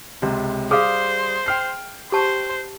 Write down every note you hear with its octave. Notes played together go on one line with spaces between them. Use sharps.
C#2 C3
G3 G#4 C5 F5 D#6 F6
G5 F6 C7
G4 C5 A5